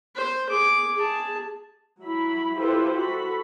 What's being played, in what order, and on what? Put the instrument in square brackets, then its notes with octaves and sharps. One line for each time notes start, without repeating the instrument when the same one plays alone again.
[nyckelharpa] C5
G#4 D6
G#4 A5
[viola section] F#3 E4 B5
E4 F4 G4 A4 B4 C5
F#4 A4 B5